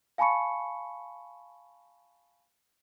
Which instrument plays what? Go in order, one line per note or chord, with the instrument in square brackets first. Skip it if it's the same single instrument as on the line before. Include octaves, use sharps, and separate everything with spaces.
[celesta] F5 G#5 A5 B5 C#6 C#7